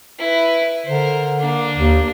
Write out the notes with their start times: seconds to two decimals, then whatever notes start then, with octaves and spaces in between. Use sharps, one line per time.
0.19 E4 B4
0.86 D3 A#4 C5
1.39 A#3 D4
1.77 D#2